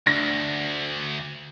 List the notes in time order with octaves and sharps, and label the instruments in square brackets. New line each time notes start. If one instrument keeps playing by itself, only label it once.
[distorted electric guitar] D2 [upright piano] D4 A#6